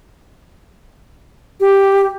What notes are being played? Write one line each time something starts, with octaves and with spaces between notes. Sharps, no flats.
G4